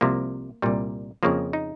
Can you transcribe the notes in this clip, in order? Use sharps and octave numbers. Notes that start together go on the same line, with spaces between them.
C2 C3 F3 A#3
C2 A#2 G3
F2 C#3 F3 A#3
D#4